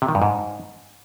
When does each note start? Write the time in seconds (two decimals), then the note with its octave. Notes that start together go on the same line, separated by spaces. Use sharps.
0.02 C3
0.08 D#3
0.15 G2
0.22 G#2